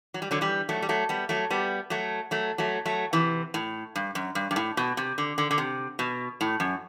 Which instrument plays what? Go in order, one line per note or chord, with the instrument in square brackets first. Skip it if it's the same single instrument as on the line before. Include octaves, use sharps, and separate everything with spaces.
[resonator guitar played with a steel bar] F#3
G3
D3 F#3
E3 G3
F#3 A3
G3
F#3 A3
G3 B3
F#3 A3
G3 B3
F#3 A3
F#3 A3
F#3 A3
F#3 A3
C3 E3
A2
G2
F#2
G2
G2
A2
B2
C3
D3
D3
D3
C3
B2
A2
F#2